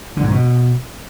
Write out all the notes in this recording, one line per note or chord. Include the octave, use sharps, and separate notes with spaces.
D3
G#2
B2